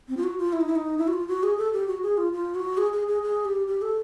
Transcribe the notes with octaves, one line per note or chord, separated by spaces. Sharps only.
C4
F4
F#4
F4
E4
D#4
E4
D#4
E4
F#4
F4
F#4
G#4
A4
G4
F#4
G#4
F4
F4
F#4
G#4
G#4
G#4
G#4
G4
G4
A4